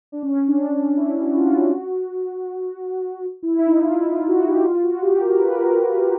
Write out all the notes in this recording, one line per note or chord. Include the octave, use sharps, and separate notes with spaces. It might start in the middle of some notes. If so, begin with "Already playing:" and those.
D4
C#4
D4
D4
E4
F#4
F4
F#4
E4
E4
D#4
F4
E4
F4
F#4
G4
F4
F#4
G4
A#4
B4
A#4
G4